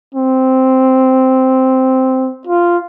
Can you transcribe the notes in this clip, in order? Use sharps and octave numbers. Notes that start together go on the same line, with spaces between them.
C4
F4